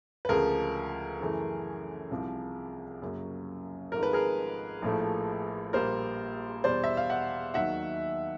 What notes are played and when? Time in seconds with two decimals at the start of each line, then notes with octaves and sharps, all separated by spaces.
0.25 B4
0.29 D2 C#3 F3 G#3 G#4 A#4
1.20 F#2 C#3 E3 A3
2.11 C2 C3 F3
3.02 F#2 C#3 F#3 A#3
3.92 G#1 G#2 F3 A3 A#4
4.03 B4
4.13 G#4 A#4
4.82 A#1 A2 F3 A3
5.73 A#1 A#2 G3 A#3 A#4 C5
6.64 E2 B2 G3 C5 D5
6.84 E5
6.97 F5
7.10 E5 F#5
7.54 D#2 D#3 F#3 E5 F#5